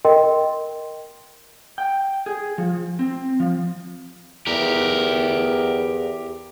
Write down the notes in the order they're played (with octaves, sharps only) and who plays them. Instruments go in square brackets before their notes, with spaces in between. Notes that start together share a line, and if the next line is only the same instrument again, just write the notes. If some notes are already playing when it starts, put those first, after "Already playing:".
[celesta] A#4 D#5 G5 C6
[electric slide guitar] G5
G#4
F3
C4
F3
[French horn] E2 [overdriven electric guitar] G4 A#4